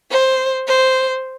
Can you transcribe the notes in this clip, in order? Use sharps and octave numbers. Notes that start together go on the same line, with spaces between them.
C5
C5